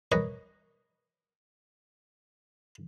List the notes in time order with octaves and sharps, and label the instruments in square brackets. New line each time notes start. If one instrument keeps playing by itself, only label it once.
[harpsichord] A#4 B4 C#5 D#5 G#5